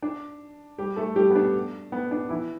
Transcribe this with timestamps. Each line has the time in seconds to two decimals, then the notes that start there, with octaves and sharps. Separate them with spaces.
0.02 D4
0.78 G3 G4
0.96 A3 A4
1.16 G3 G4
1.31 B3
1.36 D4
1.92 B3
2.11 D4
2.29 E3 E4